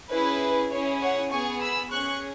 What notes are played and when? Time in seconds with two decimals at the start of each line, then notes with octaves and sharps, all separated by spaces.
0.11 C#4 E4 G#4 B4
0.71 C#4 E4 G#4 C#5
1.02 C#5 F#5
1.32 B3 G#4 G#5 C#6
1.61 B5 E6
1.92 C#4 G#4 C#6 F#6